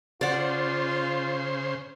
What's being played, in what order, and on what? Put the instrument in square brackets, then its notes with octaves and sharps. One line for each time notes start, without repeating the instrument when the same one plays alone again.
[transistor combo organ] C#3 C5 [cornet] F4 [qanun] D5 F#5